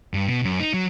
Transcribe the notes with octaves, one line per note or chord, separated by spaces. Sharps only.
G2
B2
F#2
D#4
F#3